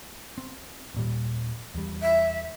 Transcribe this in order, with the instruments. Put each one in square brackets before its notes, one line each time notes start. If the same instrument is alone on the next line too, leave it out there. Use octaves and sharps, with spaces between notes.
[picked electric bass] C4
D#1 A#2 G3
E2 G3
[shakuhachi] E5